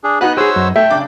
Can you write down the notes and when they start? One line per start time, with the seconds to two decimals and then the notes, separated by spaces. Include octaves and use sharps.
0.04 D4 G#4
0.21 B3 D#4 F#4 B4 F#6
0.37 G4 G#4 C5 C#5 E6
0.56 F#2
0.76 A3 E5 G5
0.91 C#3 D4 D6